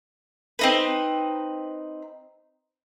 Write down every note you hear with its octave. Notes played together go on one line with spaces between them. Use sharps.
C4 D#4 B4